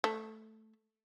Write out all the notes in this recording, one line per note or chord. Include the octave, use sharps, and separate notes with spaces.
A3